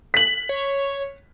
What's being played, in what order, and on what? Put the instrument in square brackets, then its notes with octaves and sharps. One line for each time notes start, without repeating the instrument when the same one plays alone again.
[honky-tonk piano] B6 F#7
[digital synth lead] C#5